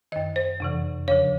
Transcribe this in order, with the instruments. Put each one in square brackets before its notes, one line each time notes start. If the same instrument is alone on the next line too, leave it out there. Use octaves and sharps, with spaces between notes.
[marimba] F#2 D#3 D#5
C5
F2 C3 E3
E2 C#3 F3 C#5